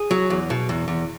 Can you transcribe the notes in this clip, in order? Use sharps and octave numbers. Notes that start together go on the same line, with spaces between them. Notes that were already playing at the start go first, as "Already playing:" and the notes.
Already playing: G#4
F#3
E2
B2
E2
E2